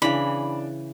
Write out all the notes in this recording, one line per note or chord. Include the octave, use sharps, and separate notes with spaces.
C#3 E3 D4 B5